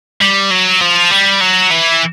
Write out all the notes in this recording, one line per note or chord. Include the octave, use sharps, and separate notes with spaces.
G3
F#3
F3
G3
F#3
E3